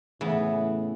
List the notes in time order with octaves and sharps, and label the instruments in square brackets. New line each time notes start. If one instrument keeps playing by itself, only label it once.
[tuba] A2 [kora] C#3 B3 [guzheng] E3